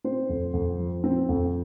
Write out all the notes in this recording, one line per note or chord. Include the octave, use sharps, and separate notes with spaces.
C4 C5
F2
F2
F3
C4
F2